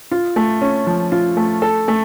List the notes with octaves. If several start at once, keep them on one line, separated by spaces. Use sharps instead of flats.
F4
A3
C#4
F3
F4
A3
A4
A3